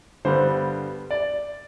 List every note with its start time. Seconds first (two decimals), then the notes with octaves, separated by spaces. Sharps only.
0.25 G2 D3 G3 B3 C5
1.11 D5